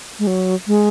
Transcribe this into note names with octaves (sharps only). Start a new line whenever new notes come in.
G#3
F#3
G#3